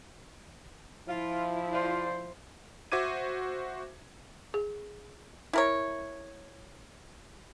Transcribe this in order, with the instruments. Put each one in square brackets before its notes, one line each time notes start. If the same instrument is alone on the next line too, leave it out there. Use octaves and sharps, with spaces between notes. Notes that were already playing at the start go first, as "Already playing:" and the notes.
[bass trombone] F3 [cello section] E4 [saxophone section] F4
[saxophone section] F4 D5 [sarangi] C5
[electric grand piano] F#4 C5 E5 D6 G#6 D#7
[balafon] G#4
[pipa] E4 A#4 C#5